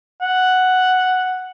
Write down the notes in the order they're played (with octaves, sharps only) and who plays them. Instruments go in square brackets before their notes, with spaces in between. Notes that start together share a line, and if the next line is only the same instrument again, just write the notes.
[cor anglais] F#5